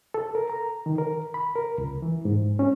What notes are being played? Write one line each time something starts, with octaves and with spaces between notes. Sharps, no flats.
A4
A#4
A#5
D#3
A#4
B5
A#4
C#2
E3
G#2
C#4